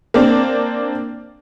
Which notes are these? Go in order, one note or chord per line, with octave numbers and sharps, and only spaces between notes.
A#3 C4 D4